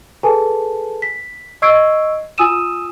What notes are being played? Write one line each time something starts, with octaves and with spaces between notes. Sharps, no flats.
G#4 A4 B4 G#5 A5
B6
D#5 C#6 E6 G#6 C7 D7
F4 G#5 D#6 E6 D#7 E7